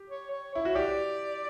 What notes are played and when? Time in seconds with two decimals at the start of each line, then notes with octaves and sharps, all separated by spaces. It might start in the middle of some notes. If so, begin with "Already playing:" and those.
Already playing: G4
0.10 C#5
0.31 C#5
0.54 E4 C#5
0.65 F#4
0.75 G4 D5